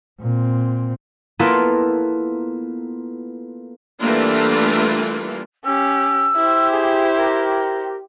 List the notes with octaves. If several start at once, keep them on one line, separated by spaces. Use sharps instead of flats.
A#2 C4
A#3 B3 E4 F4 A4 A#4
E3 G3 A3 A#3 D4 F4
C#4 G4 E6
E4 G4 C5
G#4
A#4